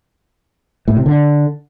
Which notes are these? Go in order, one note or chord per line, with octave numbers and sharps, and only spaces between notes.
A2
C3
D3